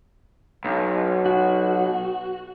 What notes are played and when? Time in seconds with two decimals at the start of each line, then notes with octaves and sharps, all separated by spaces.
0.65 B1
1.26 F#4